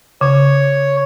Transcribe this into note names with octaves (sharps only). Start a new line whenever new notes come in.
C#3 C#5